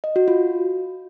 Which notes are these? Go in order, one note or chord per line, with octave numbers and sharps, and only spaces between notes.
D#5
F#4
F4